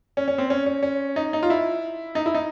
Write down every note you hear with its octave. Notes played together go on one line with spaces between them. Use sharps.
C#4
C#4
C4
C#4
C#4
C#4
D#4
D#4
F4
E4
D#4
E4
D#4